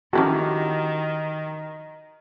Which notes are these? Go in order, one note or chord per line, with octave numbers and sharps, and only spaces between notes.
D#3 C#4 E4 F#4 G4 A4